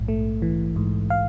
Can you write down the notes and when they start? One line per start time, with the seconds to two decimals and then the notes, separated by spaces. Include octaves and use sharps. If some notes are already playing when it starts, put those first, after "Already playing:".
Already playing: A#1 G#2
0.08 A3
0.42 E3
0.76 G#2
1.10 F5